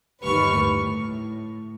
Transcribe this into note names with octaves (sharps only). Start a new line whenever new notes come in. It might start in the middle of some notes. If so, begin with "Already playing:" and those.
G1 D#2 G3 B4 C#6 F6
A2